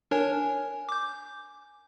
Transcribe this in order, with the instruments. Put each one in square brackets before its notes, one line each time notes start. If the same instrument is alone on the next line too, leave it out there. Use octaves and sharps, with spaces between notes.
[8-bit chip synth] D4 A#4 C#5 [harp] G#5
[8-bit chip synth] D6 G6